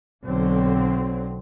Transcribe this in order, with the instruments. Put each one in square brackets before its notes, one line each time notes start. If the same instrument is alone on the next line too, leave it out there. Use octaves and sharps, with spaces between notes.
[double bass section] B1 D3 F#3 C4